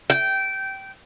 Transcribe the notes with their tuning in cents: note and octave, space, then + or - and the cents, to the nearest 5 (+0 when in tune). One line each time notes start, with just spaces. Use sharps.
G5 -15